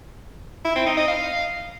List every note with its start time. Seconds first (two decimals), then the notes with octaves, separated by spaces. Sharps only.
0.65 E4
0.76 C4
0.86 D#4
0.97 D#5
1.08 F5